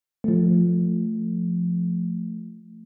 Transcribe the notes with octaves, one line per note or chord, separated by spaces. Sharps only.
F3 A3